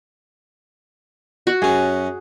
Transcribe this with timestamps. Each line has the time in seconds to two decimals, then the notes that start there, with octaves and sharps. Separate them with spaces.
1.47 F#4 F#5
1.62 F#2 C#4 G#4